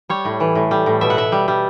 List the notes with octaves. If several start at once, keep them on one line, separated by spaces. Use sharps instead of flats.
G3 C#5
A2
E3
A2
G3
A2
B2 E5
F#5
B2 E5
G3
G3